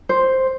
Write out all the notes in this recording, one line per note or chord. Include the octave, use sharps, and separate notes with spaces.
C5